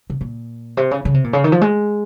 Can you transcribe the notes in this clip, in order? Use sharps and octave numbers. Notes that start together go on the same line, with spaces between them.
C3
A#2
C3
C#3
C#3
C3
A#2
C#3
D#3
F3
G#3